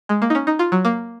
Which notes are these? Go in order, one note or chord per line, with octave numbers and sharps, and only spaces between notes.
G#3
A#3
D#4
C#4
D#4
F4
F#3
A#3